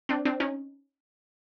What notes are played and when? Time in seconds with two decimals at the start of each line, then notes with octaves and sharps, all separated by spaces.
0.09 C4 D4
0.25 C4 D4
0.40 C#4 D#4